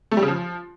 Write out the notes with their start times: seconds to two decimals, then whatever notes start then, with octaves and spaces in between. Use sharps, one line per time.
0.11 A3
0.17 G3
0.23 C#3
0.28 F3